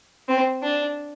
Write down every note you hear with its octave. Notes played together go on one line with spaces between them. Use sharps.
C4
D4